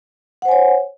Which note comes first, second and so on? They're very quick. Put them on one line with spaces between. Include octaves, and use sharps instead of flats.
F#5 C5 G#5 C#5